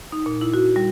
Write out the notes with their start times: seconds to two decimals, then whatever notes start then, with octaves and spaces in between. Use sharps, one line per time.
0.12 D#4
0.26 A#2
0.41 E4
0.54 F#4
0.76 G3